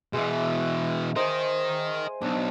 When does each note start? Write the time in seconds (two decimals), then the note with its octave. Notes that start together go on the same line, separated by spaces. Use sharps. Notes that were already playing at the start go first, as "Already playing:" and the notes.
0.13 B2 E3 G#3 E5
1.16 A#4 C5 D#5 G#5
2.22 B1 D4